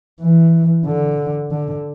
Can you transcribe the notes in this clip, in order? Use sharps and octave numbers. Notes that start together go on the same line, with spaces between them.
E3
D3
D3